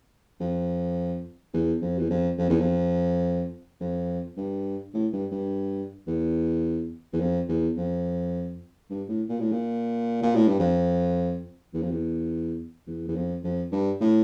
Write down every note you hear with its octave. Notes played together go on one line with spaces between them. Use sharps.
F2
E2
F2
E2
F2
F2
E2
F2
F2
G2
A2
G2
G2
E2
E2
F2
E2
F2
G2
A2
A#2
A2
A#2
A#2
A2
G2
F2
E2
F2
E2
E2
E2
F2
F2
G2
A2